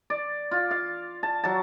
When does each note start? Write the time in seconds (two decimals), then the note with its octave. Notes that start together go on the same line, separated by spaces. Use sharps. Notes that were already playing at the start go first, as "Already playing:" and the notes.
0.10 D5
0.51 F4
0.71 F5
1.23 A5
1.44 F#3 F#4 A5